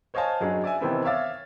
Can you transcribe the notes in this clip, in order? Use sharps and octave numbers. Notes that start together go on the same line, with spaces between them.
C5 C#5 D#5 F5 G#5 A5
F#1 F#3 D4 D#4 G#4 C#5
D5 E5 G#5
C3 D#3 E3 B3 C4 E4
C#5 E5 F5 D6 A6